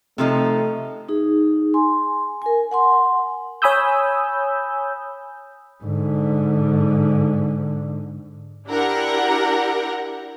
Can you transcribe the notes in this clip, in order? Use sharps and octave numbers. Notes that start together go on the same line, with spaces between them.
C3 F3 A3 D#4
D#4 G#4
G#5 C6
A#4 G#5
F#5 G#5 C6
C#5 G#5 B5 D#6 E6 G6
G#2 D3
D4 E4 G4 A#4 F#5 A#5